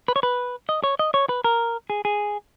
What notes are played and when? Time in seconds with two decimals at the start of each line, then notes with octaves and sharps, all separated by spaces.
0.08 B4
0.16 C#5
0.23 B4
0.69 D#5
0.84 C#5
0.99 D#5
1.14 C#5
1.29 B4
1.44 A#4
1.90 G#4
2.05 G#4